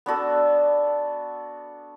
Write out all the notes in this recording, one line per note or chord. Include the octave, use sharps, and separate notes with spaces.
B3 D4 F#4 A4